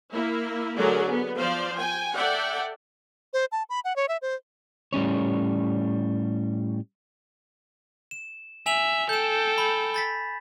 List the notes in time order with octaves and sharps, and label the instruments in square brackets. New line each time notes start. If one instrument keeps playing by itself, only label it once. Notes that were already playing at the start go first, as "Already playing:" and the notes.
[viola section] A#3 E4
D3 F#3 A3 G#4 A#4 D5
B3
F3 C5 D5 F5
G5 G#5
A4 D5 E5 F#5 G5
[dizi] C5
A5
B5
F#5
C#5
E5
C5
[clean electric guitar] A2 G3 C#4 C#5
[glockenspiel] E7
[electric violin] E5 [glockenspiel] G#5 F7 F#7
[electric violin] A4 G5 [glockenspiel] G6 E7
[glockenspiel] B5
B5 A6 B6